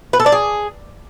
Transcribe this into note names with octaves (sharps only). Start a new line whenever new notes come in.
B4
A4
D5
G#4